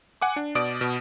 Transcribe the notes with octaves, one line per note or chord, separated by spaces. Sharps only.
F#5 G#5 D6
D4
B2 D5 D#6 D7
B2